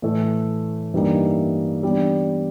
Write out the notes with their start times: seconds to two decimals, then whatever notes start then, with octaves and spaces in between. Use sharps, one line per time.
0.02 A2 E3 A3
0.93 G2 E3 G3 A#3 D#4
1.83 E3 G3 B3 D4 G4